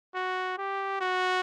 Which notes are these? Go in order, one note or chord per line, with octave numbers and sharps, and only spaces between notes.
F#4
G4
F#4